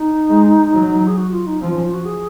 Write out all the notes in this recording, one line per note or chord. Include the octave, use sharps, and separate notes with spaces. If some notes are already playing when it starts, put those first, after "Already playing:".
Already playing: D#4
G#3
F#3
G#4
F#4
F4
D#4
F3 C4
C#4
F4
F#4
G#4